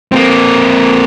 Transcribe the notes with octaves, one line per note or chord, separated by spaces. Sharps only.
A#3 C4